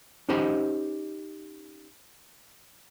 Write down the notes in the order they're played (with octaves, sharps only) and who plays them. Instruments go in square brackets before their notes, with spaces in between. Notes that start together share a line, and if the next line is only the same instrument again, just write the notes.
[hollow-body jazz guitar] C#4 D#4 G4 C5 D#5 B5